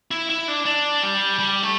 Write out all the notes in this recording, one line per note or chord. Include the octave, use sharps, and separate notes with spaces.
E4
E4
D4
D4
G3
G3
A3